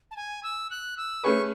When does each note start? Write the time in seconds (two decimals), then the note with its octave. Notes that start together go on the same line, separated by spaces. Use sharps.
0.11 A5
0.16 G#5
0.43 E6
0.71 F#6
0.97 E6
1.23 A3 C#4 G#4 B4 C#6